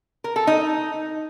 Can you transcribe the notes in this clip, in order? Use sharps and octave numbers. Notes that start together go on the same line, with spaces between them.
A#4
A4
D#4